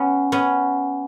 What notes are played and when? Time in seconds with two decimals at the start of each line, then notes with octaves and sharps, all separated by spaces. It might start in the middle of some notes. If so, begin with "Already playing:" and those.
Already playing: B3 C#4
0.32 B3 C#4